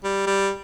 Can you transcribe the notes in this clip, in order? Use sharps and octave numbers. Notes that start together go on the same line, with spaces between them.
G3
G3